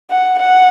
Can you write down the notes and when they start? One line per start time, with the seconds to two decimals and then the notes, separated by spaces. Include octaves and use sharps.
0.11 F#5
0.39 F#5